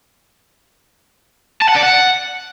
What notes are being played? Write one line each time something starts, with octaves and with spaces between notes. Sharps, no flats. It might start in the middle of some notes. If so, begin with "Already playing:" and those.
A5
F#5
D5
F#5